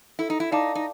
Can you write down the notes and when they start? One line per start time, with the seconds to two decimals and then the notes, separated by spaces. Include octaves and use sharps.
0.19 E4 A4
0.30 D#4
0.40 E4
0.52 D#4 D5 F5 A5 D6
0.75 D#4